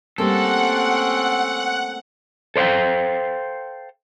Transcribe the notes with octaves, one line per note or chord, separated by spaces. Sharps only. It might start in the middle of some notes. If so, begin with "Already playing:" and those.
G3 A3 A#3 C4 C#4 A4 F#5
A4 C5 D5 F5 G5